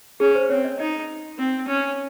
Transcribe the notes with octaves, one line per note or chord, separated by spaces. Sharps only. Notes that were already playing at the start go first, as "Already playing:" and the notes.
C#4 G#4
C5
C4 C#5
D#5
D#4 D#5
C4
C#4